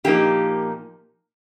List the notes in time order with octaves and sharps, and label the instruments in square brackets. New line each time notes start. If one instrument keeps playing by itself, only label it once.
[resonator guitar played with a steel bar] A#2 F3 A#3 D#4 G4